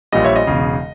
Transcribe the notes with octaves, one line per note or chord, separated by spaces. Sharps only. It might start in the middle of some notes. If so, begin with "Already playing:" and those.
A#1 A#2 G3 D#5
C#5 E5
D#5
E1 E2 C#3